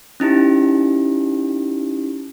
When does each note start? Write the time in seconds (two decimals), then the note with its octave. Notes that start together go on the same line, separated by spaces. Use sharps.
0.20 C#4 D#4 E4 G4